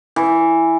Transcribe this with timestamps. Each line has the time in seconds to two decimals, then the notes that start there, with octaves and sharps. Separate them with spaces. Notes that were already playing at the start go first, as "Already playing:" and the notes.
0.16 E3